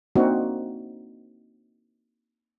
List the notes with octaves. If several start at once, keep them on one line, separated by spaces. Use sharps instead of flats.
A#3 C4 D4 D#4 F#4